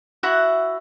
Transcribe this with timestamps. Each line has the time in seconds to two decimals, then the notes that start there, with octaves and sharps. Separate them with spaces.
0.23 E4 F#4 E5 F#5